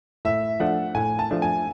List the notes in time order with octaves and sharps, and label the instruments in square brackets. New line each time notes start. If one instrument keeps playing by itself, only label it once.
[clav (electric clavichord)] A2 [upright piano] E5
[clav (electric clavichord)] F3 A3 D4 [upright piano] F#5
[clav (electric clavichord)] A2 [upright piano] G#5
[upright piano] A5
[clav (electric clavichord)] F3 A3 D4
[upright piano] G#5